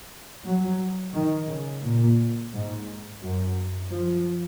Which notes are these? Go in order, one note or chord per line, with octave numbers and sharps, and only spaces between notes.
F#3
D#3
C#3
A#2
G#2
F#2
F3